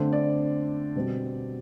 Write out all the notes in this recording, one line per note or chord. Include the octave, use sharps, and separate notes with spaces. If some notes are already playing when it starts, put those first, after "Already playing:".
Already playing: D3 A3 C4 C5
D5
B2 G3 C4